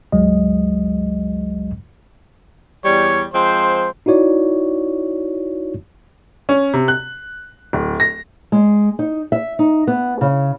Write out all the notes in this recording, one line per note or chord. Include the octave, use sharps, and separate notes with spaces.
G1 C#2 F#3 G#3 D#5
E2 G3 C#5
F3 G#3 C4 C5
D#4 E4 F#4 C#5 D5
C#4
C3
F#6
D1
A#6
G#3
D#4
E5
D#4
B3
C#3